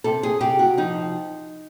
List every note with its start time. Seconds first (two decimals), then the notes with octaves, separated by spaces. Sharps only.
0.04 C3 A4
0.23 G#4
0.40 C3 G4
0.59 F#4
0.77 F3 D#4